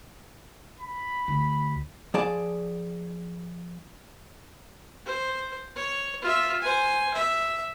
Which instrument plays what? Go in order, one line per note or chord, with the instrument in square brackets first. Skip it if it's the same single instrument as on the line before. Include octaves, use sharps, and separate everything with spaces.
[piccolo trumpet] B5
[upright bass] D2
[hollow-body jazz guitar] F3 G#4 D5 A5
[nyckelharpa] C5
C#5
F4 E5
C5 G#5
E5